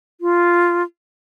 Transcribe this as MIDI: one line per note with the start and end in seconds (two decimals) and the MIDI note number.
0.21 0.83 65